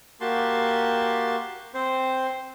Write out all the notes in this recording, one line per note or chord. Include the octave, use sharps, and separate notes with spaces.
A#3 F#4 G4 A5 C6
C4 C5